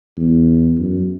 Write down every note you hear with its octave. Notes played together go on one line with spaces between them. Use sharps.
E2
F#2